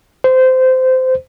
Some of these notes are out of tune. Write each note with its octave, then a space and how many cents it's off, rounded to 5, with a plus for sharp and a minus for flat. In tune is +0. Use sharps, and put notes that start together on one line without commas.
C5 -20